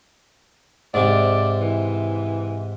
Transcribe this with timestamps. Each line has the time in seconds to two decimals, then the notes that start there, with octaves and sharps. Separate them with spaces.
0.94 G#2 C3 D5
1.61 E3